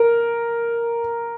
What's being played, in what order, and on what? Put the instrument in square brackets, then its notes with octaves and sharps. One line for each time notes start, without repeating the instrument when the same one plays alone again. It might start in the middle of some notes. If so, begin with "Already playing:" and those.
Already playing: [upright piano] A#4